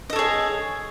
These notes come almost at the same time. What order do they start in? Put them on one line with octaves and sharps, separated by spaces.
D#5 A4 C#5 G#4